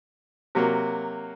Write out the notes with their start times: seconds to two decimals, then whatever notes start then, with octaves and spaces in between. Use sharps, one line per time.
0.55 C3 F#3 A#3